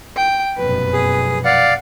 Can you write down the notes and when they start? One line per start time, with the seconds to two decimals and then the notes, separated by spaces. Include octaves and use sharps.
0.16 G5
0.57 F1 F#2 B2 B4
0.93 G#4
1.45 D5 F5 F#5